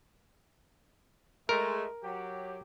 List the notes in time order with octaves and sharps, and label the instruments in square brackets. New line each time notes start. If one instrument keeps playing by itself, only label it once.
[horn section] G#3 A3 [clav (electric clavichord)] A#4
[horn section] F#3 G4